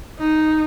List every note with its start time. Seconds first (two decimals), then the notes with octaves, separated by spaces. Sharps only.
0.19 D#4